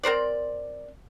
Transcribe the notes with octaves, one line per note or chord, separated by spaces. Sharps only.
C4 A#4 C5 D5